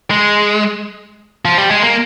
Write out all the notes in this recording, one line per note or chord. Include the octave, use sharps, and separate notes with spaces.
G#3
F3
G3
G#3
A#3